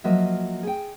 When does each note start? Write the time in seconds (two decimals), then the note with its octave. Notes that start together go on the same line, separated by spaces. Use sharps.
0.04 F3 F#3 A#3 F#4 D#5 E5
0.63 G#4 G5